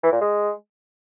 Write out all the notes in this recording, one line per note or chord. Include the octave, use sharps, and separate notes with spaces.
E3
A#2
G#3